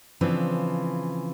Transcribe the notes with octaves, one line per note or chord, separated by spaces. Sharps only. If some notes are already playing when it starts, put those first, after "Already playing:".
C#3 E3 F3 C4 D4